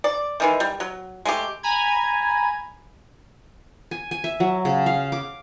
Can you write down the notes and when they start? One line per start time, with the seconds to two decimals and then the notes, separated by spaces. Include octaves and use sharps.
0.04 D5
0.40 D#3 E3 G#3
0.60 G3
0.80 F#3
1.25 G#3 A3 G4
1.63 G#5 A#5 B5 G#6
3.91 G#5
4.11 G#5
4.24 E5
4.40 F#3
4.65 C#3
4.86 F5
5.12 D6